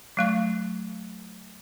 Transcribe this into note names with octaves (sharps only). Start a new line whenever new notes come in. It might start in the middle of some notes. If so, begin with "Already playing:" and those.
F#3 A3 C#6